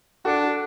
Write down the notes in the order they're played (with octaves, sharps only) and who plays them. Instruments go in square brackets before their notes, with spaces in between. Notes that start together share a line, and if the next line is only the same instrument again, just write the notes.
[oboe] D4 [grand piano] F#4 A4